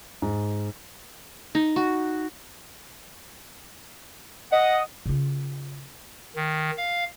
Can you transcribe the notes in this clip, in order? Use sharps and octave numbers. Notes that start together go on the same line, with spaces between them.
G#2
D#4
F#4
D#5 F#5
C#3 F4
D#3
F5